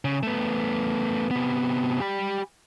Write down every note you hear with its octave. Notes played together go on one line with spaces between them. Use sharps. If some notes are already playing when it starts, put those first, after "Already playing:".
C#3
A3 B3
C3 B3
G4 B5